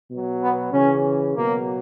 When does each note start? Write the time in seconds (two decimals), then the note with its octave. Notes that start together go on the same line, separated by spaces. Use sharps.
0.10 B2 F#3
0.42 B3
0.73 C#3 E3 C#4
1.36 B2 F#3 A#3